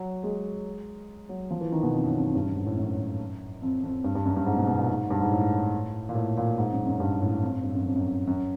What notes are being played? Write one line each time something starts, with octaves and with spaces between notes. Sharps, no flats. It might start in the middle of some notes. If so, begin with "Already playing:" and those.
Already playing: F#3
G#3
F#3
F3
E3
D#3
B2
F2
F#2
F2
F#2
G2
F#2
G#2
A2
F#2
F2
F2
G2
G2
F#2
G2
G#2
B2
B2
A#2
G#2
G2
G#2
A2
A#2
A2
A#2
G#2
F#2
F#2
G2
A2
F2
G2
F#2
F2
F#2
F#2